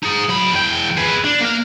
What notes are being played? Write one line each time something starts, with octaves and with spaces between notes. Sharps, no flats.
D#4 G#4
F#3 B5
E2 G5
G#4 B4
D4
A#3 F5